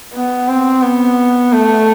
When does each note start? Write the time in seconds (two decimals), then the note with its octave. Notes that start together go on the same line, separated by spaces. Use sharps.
0.14 B3
0.48 C4
0.82 B3
1.52 A3